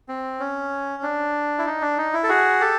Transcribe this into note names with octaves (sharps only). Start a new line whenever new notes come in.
C4
C#4
D4
E4
D#4
D4
D#4
E4
A4
F#4 G#4
G4 A4